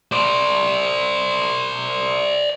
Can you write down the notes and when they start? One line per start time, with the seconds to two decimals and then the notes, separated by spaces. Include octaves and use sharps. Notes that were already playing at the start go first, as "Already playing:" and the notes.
0.12 C5 D5